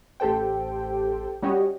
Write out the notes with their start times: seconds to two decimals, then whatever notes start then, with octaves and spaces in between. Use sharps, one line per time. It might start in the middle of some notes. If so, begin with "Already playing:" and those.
0.20 A1 G4 A4 C5 G5
1.42 G3 C#4 F#4 G4 C#5 D#5